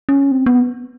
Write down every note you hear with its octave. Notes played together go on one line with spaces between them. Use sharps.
C#4
C4
B3